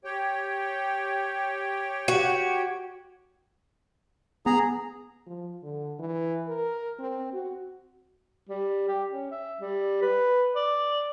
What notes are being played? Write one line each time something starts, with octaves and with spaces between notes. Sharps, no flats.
G4 C#5 G5
F#4
B3 G#4 A#5
F3
D3
E3
A#4
C4
F#4
G3
G4
C#4
E5
G3
B4
D5